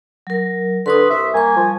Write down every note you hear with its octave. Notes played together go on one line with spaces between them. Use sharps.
F#3 A#4
D3 B4 C6 C#6 D#6
C2 E5
G3 A#3 G#5 C#6
F3